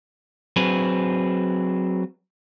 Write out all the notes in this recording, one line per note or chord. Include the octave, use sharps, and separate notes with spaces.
F#3 C4 G#4 B4